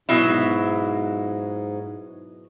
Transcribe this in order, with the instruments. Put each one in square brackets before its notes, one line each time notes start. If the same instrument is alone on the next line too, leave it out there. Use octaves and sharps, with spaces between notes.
[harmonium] G#2 [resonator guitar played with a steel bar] B2 F#3 E4